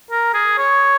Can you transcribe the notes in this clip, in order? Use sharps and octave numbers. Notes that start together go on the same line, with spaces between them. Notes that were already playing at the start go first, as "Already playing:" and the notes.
A#4
G#4
C#5